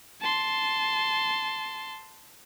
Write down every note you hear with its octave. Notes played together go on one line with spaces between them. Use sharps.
A5 C6